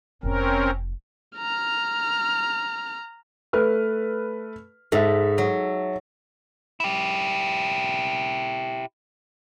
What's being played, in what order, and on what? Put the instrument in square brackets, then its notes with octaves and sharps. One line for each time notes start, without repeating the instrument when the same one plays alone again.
[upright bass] F1 F4 [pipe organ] C4 C#4 A#4
[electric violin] A#5 F6
[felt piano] A3 B4 F6
[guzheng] G#2 [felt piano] A4 E5
[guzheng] F#3
[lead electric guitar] E4 G4